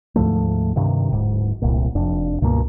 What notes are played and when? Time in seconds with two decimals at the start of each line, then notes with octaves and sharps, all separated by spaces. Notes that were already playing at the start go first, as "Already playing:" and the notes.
0.16 D2 G#2 F3 A3
0.76 G2 C3 D#3
1.13 D1 G#2
1.62 D1 C2 A#2
1.95 F1 F2 D4
2.42 C#2 G2 B2 A#3